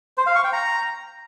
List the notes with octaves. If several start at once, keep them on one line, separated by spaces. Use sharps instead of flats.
C5
F5
C#6
G5
A#5